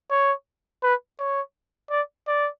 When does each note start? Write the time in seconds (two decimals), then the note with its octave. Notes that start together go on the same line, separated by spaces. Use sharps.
0.11 C#5
0.83 B4
1.19 C#5
1.90 D5
2.27 D5